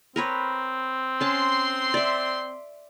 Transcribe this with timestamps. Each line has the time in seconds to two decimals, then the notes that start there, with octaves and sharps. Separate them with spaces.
0.16 C4 A#4 B4 C#5
1.21 C#4 A5 C6
1.94 D5 E5